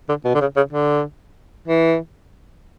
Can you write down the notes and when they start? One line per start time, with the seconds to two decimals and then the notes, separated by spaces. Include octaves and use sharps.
0.09 D3
0.25 B2
0.35 D3
0.41 C#3
0.56 C#3
0.73 D3
1.68 E3